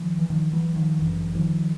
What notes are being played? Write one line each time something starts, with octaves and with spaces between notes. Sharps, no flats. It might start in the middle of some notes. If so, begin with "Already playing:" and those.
Already playing: D#3 F3
E3
D#3 F3
E3 F#3
D#3 F3
G1 F#2 D3 E3 F#3
D#3 F3